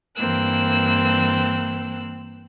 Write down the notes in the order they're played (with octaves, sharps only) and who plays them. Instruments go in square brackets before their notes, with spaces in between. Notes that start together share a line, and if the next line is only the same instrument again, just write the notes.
[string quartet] G2 E3 A#3 C4 E6 F#6